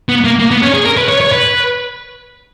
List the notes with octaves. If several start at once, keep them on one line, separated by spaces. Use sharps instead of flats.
B3
A#3
A#3
B3
C#4
G#4
A#4
B4
C#5
C#5
B4